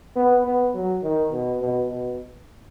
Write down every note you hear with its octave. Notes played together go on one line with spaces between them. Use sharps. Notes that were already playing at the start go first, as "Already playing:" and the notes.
B3
B3
F#3
D#3
B2
B2
B2